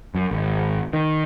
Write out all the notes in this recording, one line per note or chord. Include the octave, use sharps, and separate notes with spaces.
F#2
G#1
D#3